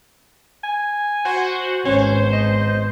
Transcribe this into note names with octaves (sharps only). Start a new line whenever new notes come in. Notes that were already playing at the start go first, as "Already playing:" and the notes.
G#5
F#4 C5 F#5
G#1 B3 C#4 C5
D#5